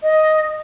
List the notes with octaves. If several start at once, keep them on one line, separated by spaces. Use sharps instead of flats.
D#5